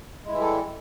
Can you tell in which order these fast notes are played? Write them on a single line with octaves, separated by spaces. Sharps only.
G#3 E4 E3 G3 A4